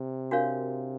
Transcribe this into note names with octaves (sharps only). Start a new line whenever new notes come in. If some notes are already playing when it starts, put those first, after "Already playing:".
Already playing: C3
D4 F#4 A#4 C#5 F5